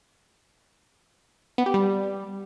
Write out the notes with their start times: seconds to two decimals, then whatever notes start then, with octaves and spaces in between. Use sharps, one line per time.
1.58 B3
1.66 G4
1.74 G3